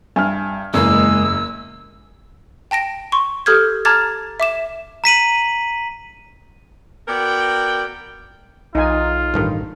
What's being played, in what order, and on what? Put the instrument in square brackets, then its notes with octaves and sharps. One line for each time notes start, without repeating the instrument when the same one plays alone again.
[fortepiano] G2 E5 [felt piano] G#5 F6
[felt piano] F#1 [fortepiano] E2 A#3 [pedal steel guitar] G#3 [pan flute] E6
[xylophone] G5 A5 A#6 D7
C6 C#6
G4 A4 D#6 F6 G6 G#6
A5 A#5 D6 F6 G#6 A6
E5 D6 E7
[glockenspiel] A#5 B6 D#7 F#7
[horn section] B3 F#4 A#4 D5 G5
[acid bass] B1 [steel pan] D#4 G#5 [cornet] F4
[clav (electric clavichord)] A1 G2 D#3